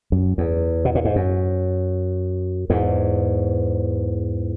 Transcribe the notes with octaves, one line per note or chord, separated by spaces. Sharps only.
F#2
E2
B2
A#2
G#2
F#2
E2 G#2